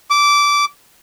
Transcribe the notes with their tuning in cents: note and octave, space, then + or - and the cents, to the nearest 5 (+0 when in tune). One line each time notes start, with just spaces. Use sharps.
D6 -15